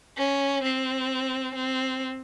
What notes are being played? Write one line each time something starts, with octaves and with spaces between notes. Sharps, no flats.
C#4
C4
C4